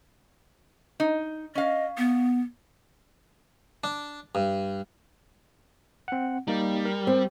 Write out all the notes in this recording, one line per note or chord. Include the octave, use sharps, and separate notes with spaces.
D#4
C#4 D#5 F5
B3
D4
G2
C4 F#5
G3 A#3 D#4
A#4
C4